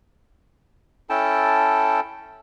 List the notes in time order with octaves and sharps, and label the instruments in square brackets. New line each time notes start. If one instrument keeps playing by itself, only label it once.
[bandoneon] C#4 E4 A4 G5 A5